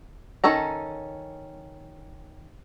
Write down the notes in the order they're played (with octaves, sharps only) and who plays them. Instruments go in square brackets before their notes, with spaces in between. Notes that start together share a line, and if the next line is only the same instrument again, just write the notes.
[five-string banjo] D#3 C#4 A4 A#5